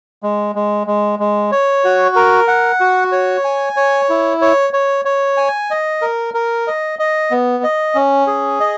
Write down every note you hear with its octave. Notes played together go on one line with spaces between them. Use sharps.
G#3
G#3
G#3
G#3
C#5
F#4
A#4
F#5
F#4
C#5
G#5
C#5
E4
C#5
C#5
C#5
G#5
D#5
A#4
A#4
D#5
D#5
B3
D#5
C#4
G#4
D#5